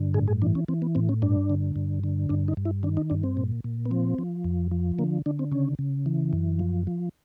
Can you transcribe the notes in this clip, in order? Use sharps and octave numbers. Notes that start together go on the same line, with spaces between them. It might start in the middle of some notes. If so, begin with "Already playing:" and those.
Already playing: G2 D3
A2 G#4
G#4
E3 D4
C#4
E3 C4
B3
A2 C4
C#4
G2 D4
D3
G2
D3
G2 D4
D#4
G2
E4
D#3 D4
D#4
G2 D4
C4
A#2
A#2
B3
F3 C4
F3
F2
F3
D3 A#3
D3 D4
C4
C#3 C#4
C#3
E3
F#2
F3
F3